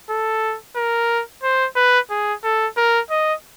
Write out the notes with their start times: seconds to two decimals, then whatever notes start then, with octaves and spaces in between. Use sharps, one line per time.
0.10 A4
0.76 A#4
1.43 C5
1.76 B4
2.10 G#4
2.44 A4
2.77 A#4
3.10 D#5